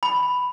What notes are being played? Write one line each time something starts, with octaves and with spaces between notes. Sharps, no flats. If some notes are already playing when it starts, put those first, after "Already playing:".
B5